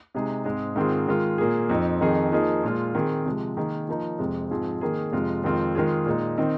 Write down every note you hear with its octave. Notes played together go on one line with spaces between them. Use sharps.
C3 G#3 D#4 G#4
G#2 G#3 C4 G#4
G#2 D#3 C4 F4 G#4
D#3 G#3 F4 G#4
A#2 A#3 G#4
F2 F3 C4 D#4
F2 D#3 C4 D#4 G#4
F3 A#3 D#4 G#4
A#2 G#3 F4
D#3 C4 G#4
C3 F3 G#3
D#3 A#3 D#4 G#4
F3 A#3 D#4
F2 C3 G#3
G#2 F3 C4 G#4
D#3 A#3 D#4 G#4
F2 C3 G#3 F4
F2 D#3 G#3 C4 F4
D#3 G#3 F4 G#4
A#2 G#3 D#4
D#3 C4 D#4